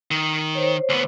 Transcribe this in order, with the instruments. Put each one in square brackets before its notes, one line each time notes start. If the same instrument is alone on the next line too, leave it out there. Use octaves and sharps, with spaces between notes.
[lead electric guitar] D#3
[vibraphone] C5 C#5
[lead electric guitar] D2 B3